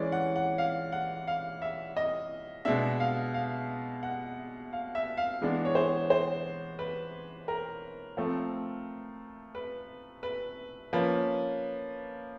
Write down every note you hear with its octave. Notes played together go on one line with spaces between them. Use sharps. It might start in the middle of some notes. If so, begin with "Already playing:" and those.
Already playing: E3 G#3 C#4 D5
F#5
F#5
F5
F#5
F5
E5
D#5
B2 G#3 B3 D4 E5
F5
F5
F#5
F5
E5
F5
E3 G#3 B3 D4
C#5
C5
C5
B4
A#4
F3 A3 C4
B4
B4
F3 A#3 C#4 B4